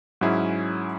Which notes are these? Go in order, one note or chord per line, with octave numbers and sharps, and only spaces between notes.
G#2 F#3 C#4 E4 G#4